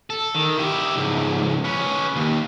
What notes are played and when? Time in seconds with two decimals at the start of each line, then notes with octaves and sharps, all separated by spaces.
0.10 A4
0.35 D#3
0.58 E4 G4
0.96 C#2 G#2
1.64 C#4 B4
2.16 D#2